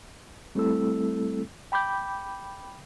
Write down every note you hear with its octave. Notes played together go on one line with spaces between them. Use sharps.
G3 A3 C4 E4 A4 E6
G5 B5 D6 G6